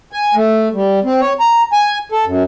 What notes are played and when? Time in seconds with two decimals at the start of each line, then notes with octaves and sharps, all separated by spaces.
0.13 G#5
0.35 A3
0.74 G3
1.04 C4
1.21 C#5
1.40 A#5
1.73 G#5
2.12 A4
2.26 F#2